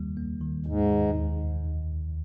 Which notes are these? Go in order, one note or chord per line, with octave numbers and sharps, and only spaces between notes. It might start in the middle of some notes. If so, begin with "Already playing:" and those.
Already playing: D#2 D#3 G3 A#3
A#3
D#3
D#2 G#2
D#3
D#2